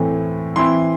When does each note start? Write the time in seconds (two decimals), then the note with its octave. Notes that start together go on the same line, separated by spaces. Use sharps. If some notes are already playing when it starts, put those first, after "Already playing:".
Already playing: A2 E3 A3 C4
0.56 E3 C4 E4 C6